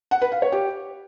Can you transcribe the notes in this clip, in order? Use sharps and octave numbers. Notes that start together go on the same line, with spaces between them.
F#5
B4
F5
C#5
G4